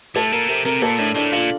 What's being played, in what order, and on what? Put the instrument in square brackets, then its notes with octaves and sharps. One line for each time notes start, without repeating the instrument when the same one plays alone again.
[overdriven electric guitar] A2 [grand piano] A4
[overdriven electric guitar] A#2 [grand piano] A#4
[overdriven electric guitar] C3 [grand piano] A#4
[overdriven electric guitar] C3 [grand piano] A#4
[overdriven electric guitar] A#2 [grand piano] A4
[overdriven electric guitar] A2 [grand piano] D4
[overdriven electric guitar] A2 [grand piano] D4
[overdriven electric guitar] A#2 [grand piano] F4